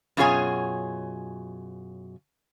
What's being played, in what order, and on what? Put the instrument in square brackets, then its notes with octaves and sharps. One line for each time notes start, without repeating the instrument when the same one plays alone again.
[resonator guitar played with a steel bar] F#2 B2 F4 G#4 C#5 G#5